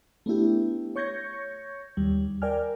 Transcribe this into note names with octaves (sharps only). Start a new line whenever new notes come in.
A3 B3 D4 E4 G4
C#5 C#6 G6 G#6 A#6 C#7
D#2 G3
A#4 D5 G5 G#5 F6